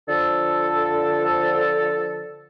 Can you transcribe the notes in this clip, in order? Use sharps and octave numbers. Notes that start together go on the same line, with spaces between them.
D3 F3 A4